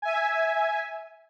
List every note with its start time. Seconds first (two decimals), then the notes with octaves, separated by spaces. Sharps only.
0.02 E5 G#5